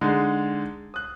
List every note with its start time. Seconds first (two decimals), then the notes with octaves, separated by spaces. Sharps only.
0.01 D3 G#3 D#4
0.94 D#6 F#6